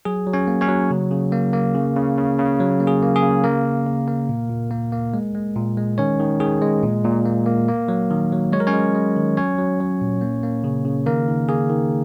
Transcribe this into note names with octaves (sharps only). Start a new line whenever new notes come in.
F#3 G#4
F#3
C#4 C#5
A#3
C#4 C#5
F#3
C#3
C#3
A#3
A#3
C#3
C#3
C#3
C#3
F#3
A#3
G#4
A#3
G#4
C#3
A#3 A#4
C#3
C#3
A#3
A#2
A#2
A#3
A#3
G#3
G#3
A#2
G#3
D#3 C#4 C#5
D#3
D#3 G#4
G#3
A#2
A#2
A#3
A#3
A#3
F#3
D#3
F#3
G#3 C#5
A#4
C#4 C#5
G#3
G#3
D#3
F#3 C#4 C#5
F#3
F#3
A#2
A#3
A#3
C#3
C#3
D#3 A#3 A#4
D#3
A#3 G#4
D#3